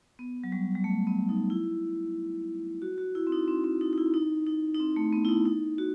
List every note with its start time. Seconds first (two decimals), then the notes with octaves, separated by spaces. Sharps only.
0.19 B3
0.44 F#3
0.52 G3
0.75 G3
0.84 A3
1.07 B3
1.29 D#4
1.50 E4
2.82 F#4
2.98 F#4
3.15 E4
3.27 C4
3.32 D#4
3.48 C4
3.64 C4
3.81 D#4
3.93 D#4
3.98 E4
4.14 D#4
4.47 D#4
4.75 D#4
4.80 C4
4.96 A3
5.13 B3
5.25 E4
5.29 D#4
5.46 D#4
5.78 F#4